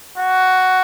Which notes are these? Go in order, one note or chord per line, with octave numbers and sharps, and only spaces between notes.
F#4